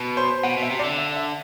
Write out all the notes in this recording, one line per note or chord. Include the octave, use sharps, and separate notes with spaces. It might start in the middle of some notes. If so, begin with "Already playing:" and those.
Already playing: B2
C5
B2 F#5
B2
E5
C3
D3 D5
E5
E5